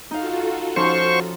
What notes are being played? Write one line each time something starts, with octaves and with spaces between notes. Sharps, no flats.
D#4 F4 F#4 A4 F5
F3 C#4 D#4 C5 C#6